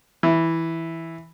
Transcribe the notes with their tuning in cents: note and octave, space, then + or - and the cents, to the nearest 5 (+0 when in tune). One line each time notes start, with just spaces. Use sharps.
E3 -5